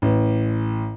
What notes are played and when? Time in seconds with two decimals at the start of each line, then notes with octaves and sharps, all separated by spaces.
0.02 A1